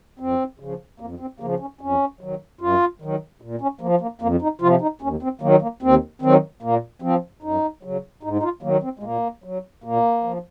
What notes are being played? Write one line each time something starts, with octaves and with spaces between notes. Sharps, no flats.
F2 C4
C#3 F3
F2 A#3
C4
C#3 F3 A#3
C#4
F2 C#4
D#3 F#3
F#2 F4
D#3 F#3
A#2
C#4
F3 A#3
A#3
F2 A#3
D#4
C3 F3 F4
D#4
D#2 C#4
C4
D#3 F#3 A#3
A#3
D#2 C4
D#3 F#3 C4
A#2 A#3
F3 C4
F#2 D#4
C#3 F#3
G#2 D#4
D#4
F4
D#3 F#3 A#3
C4
G#3
A#2 A#3
F#3
A#2 A#3
F3